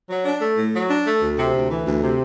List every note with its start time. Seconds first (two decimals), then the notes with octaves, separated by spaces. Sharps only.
0.09 F#3
0.25 D4
0.41 A3
0.57 A2
0.73 F#3
0.90 D4
1.05 A3
1.21 D2
1.38 C3
1.54 D2
1.70 E3
1.86 D2
2.02 C3